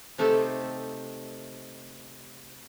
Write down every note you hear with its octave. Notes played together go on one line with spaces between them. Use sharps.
C3 A3 D#4 G4 A4 C5